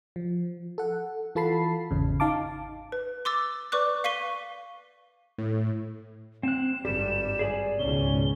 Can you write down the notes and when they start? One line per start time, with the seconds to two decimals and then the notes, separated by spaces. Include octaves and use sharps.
0.16 F3
0.78 A4 F#5
1.35 E3 F4 A4 A5 B5 C7
1.91 G#1 E2 C#3
2.20 D#4 F5 A5 D6
2.92 B4
3.25 C6 D6 E6 A6
3.72 B4 D5 C#6 D6 F#6
4.04 F5 C#6 B6 D#7 G7
5.38 A2
6.43 C4 F#6 E7
6.85 G#1 G2 G3 G4 A4
7.39 G#4 D5 G#5
7.79 C#2 G#2 B2 C#4 G7